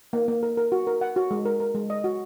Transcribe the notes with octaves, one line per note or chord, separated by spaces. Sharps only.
A#3
A#3
A#4
A#4
F#4
A#4
F#5
F#4
G#3
A#4
A#4
G#3
D#5
F#4